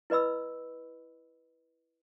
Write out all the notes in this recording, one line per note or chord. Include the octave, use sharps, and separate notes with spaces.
E4 B4 D#5 B5 E6